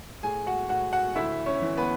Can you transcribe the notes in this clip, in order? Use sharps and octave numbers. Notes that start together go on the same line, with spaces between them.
A2 G#4 G#5
F#4 F#5
A2 F#4 F#5
F#4 F#5
D2 E4 E5
C#4 C#5
E3
B3 B4